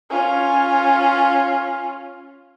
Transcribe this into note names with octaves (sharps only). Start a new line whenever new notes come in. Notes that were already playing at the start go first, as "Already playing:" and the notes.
C#4 F4